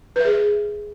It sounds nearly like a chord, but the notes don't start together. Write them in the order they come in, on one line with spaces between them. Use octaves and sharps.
B4 E5 G#4